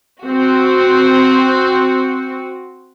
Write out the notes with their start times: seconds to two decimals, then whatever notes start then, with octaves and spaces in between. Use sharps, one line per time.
0.22 C4 F#4